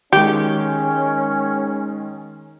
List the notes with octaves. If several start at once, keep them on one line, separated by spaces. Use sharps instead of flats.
D#3 G#3 C#4 G4